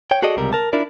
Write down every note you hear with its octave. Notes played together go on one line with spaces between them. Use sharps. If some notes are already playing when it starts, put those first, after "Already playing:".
C#5 G5
F#4 G#4 A4 D5 D#5
C#2 C3 G3 A#4
A#4 A5
D4 E4 F4 A#4 D5